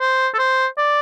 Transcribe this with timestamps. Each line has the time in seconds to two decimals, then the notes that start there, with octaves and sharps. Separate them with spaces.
0.01 C5
0.34 A4
0.39 C5
0.78 D5